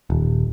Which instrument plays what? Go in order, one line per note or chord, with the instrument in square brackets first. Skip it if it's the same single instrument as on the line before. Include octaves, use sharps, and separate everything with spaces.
[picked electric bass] D#1